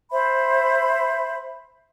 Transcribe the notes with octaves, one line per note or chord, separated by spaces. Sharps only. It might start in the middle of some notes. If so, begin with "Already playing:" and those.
C5 E5 B5